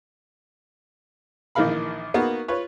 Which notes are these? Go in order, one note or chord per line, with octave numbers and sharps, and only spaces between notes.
A#1 D#3 E3 A#4 F5 B5
A#3 B3 D#4 F#4
F4 B4 C#5